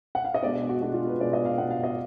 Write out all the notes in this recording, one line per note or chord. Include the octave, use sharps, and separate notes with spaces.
F#5
F5
D#5
B2 G#3 D4 D5
F#4
B2 G#3 D4 F#4
F4
B4
B2 G#3 D4 D5
D#5
F5
B2 G#3 D4 F#5
F5
D#5